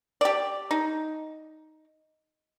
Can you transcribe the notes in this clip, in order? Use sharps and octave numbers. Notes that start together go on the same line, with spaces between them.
G4 D5
D#4